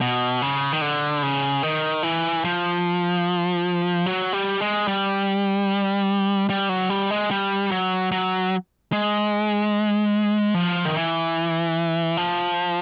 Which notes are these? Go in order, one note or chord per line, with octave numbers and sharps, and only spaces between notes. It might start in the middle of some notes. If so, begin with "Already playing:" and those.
B2
C#3
D#3
D3
C#3
D#3
E3
F3
F#3
G3
G#3
G3
G3
F#3
G3
G#3
G3
F#3
F#3
G#3
F3
D#3
E3
F3